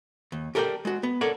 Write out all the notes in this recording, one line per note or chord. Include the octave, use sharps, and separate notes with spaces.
D#2
G4 A4 A#4 C#5 D5 G5
G#3 F#4
B3
A4 A#4 C#5 D5 F#5